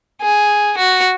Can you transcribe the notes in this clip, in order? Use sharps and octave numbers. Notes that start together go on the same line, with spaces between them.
G#4
F#4